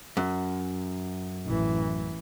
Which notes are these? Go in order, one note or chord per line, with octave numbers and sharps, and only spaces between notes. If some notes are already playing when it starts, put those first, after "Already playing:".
F#2
A1 E3